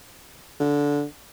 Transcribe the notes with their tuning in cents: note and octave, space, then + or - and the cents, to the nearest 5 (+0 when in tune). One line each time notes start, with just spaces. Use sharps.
D3 -15